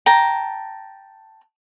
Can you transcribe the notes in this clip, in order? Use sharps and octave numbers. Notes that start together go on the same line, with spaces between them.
G5 A5 A#5